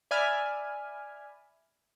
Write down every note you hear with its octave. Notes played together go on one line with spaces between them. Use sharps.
D5 E5 G#5 B5 F6